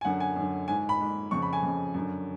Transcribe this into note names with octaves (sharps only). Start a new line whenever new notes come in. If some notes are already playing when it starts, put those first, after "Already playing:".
G#5
F#2 D3 F#5
G#5
F#2 D3
G#2 G#5
B5
G#2
F2 C#3 C#6
B5
G#5
F2 C#3
F#2 D3